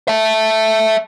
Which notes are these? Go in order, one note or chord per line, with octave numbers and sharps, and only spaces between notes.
E5 A5